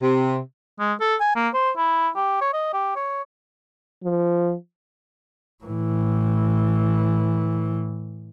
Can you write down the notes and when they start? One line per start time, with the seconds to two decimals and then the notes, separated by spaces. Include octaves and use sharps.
0.01 C3
0.80 G#3
1.01 A4
1.20 G#5
1.36 A#3
1.54 C5
1.77 E4
2.16 G4
2.42 C#5
2.54 D#5
2.74 G4
2.96 C#5
4.03 F3
5.64 A2 E3